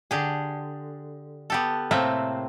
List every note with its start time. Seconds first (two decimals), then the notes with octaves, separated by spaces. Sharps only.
0.11 D3 G4 G#4
1.50 B3 G4 A4
1.91 A2 C3 A3 A#3 C4 E5